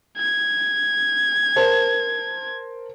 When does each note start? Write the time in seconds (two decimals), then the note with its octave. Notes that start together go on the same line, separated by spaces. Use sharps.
0.18 G#6
1.56 A#4 C5 A5